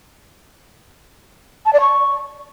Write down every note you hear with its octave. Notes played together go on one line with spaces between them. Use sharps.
A5
D5
C#6